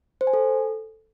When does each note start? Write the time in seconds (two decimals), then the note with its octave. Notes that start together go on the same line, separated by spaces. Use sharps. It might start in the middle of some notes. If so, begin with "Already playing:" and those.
0.21 C5
0.27 G#5
0.33 A4